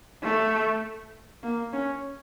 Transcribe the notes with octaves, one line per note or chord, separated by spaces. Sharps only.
A3
A#3
C#4